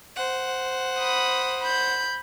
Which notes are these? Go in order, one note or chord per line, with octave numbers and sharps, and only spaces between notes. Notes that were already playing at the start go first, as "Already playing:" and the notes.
C5 F#5
B5 D#6
B5 G6